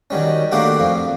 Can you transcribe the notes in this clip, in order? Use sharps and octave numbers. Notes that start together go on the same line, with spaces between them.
D#3 F#3 G3 C#4
A3 A#3 D4 F#4 G4
F2 F3